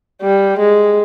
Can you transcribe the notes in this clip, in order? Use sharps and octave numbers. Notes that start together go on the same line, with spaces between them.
G3
G#3